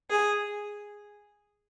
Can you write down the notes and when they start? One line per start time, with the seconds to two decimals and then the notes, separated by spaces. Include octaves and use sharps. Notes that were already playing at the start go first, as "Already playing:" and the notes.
0.10 G#4